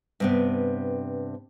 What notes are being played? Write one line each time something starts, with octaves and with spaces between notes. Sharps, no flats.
G2 C3 B3